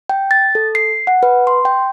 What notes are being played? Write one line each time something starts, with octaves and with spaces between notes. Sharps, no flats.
G5
A6
A4
C7
F#5
B4
C6
G5